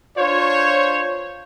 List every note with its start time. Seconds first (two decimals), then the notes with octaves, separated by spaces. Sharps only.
0.18 D4 F4 C5 C#5